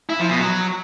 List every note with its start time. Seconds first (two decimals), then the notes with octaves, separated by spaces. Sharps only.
0.10 E4
0.20 F3
0.30 B2
0.40 F#3